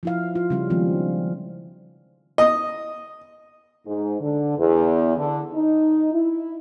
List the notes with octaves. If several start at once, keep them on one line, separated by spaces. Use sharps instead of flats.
F3 E4 F5
F4
C#3 G3 C#4
D#3 F3 G#3 B3 C4
D#5
G#2
D3
E2
D3
D#4
E4